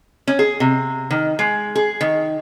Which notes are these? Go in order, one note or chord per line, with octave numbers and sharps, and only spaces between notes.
C#4
G#4
C3
D#3
G#3
G#4
D#3